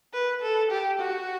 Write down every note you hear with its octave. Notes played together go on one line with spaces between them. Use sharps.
B4
A4
G4
F#4